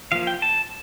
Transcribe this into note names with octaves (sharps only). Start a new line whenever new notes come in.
F3 A#3 F5
G5
A5